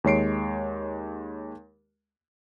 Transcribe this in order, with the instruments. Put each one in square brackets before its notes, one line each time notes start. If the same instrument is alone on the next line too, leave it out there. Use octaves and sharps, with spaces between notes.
[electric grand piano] D#2 G#3 C#5 C7 D7